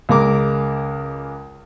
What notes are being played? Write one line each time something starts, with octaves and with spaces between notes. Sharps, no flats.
C#2 G#3 A#4 D6